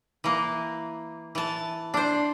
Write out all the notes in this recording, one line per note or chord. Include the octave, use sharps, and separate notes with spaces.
E3 A#3
E3 A5
D4 C5